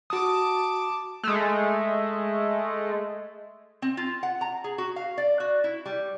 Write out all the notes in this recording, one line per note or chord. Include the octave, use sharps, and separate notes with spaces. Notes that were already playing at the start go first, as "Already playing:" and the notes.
F#4 A5 D6 D#6
G#3 A3
C4
F4
F#5
A#5
G#4
F#4
F5
D5
F#4
E4
G3